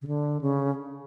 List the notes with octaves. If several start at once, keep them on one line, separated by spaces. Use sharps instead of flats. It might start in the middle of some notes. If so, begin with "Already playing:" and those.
C#3
D3
C#3